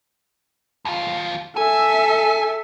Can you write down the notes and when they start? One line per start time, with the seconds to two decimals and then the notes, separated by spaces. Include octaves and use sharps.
0.85 D#2 F4
1.57 A4 E5 G#5